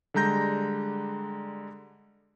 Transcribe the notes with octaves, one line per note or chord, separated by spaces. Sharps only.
D3 G3 G#3 A#5 G6 A#6